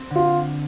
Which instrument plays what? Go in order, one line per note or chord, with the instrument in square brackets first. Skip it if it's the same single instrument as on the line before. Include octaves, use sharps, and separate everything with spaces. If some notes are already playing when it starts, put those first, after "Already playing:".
Already playing: [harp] C4
D3
[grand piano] F4